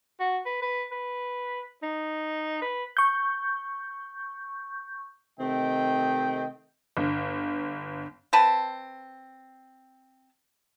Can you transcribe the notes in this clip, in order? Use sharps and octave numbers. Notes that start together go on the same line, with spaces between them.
F#4
B4
B4
B4
D#4
B4
C#6 G6
C3 D#3 A3 C4 D#5 G5
G1
C4 B4 A5